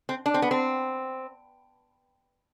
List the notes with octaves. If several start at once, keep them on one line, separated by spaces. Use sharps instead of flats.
C4
D4
C4
B3
C4